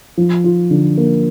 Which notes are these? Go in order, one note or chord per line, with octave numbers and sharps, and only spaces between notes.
F3
F4
D3
A#3